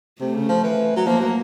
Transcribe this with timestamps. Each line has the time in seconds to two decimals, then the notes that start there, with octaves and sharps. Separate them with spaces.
0.20 C3 A3
0.35 C#3
0.49 F3
0.64 E3
0.96 F#3
1.06 F3 A#3
1.21 F#3